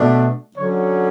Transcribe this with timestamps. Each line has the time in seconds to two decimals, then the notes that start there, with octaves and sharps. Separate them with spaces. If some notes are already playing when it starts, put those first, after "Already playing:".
Already playing: B2 A3 D4
0.56 D3 F#3 C#4 C#5